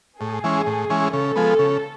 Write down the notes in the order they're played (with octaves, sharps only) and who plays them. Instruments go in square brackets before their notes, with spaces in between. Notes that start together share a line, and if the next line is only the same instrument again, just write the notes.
[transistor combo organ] A2 [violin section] G#4
[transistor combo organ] E3 G#3 C#4
A2
E3 G#3 C#4
[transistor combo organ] C#3 [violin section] A4
[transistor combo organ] F3 G#3 B3
C#3